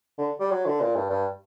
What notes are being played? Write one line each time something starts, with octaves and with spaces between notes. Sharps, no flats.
D3
G3
F#3
D3
A#2
G2
G2